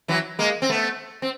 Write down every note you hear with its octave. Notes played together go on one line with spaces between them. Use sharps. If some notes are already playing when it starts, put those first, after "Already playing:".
E3 F#3
G#3 A#3
C4
A3 B3
C4